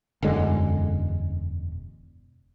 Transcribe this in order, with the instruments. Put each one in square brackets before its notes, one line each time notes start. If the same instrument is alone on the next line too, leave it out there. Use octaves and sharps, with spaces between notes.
[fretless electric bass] E1 F#2 D3 G#3